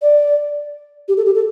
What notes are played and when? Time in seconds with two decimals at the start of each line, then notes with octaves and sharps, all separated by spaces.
0.02 D5
1.08 G4
1.17 A4
1.26 G4
1.35 A4